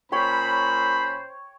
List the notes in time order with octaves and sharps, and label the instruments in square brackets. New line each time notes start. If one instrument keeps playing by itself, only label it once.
[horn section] A#2 C#4 B5 [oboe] C5 [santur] C#5 G5